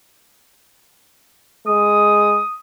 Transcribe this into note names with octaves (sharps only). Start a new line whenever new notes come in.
G#3 D#6